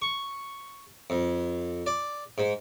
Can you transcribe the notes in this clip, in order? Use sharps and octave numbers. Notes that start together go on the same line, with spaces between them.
C#6
F2
D5
G#2